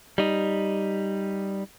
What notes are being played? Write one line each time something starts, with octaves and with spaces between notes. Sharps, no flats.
G3 D#4